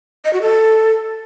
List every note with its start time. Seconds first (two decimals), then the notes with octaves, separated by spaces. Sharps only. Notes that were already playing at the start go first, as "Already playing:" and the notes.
0.25 D#5
0.33 F#4
0.42 A4